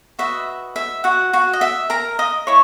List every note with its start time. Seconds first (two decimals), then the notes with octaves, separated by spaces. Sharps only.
0.19 F#4 B4 D#5 E5
0.76 E5
1.04 F#4 F#5
1.33 F#4 F#5
1.53 D#5
1.61 E5
1.90 A#4 A#5
2.19 D#5 D#6
2.47 E4 C#5 C#6